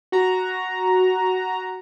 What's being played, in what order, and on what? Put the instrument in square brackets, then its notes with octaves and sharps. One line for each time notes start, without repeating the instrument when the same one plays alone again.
[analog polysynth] F#4 A#5